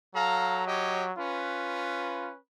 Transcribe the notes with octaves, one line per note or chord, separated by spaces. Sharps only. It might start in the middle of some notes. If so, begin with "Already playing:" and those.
F#3 A4 F5 A#5
G4 C#5 D#5
C#4 F4 B4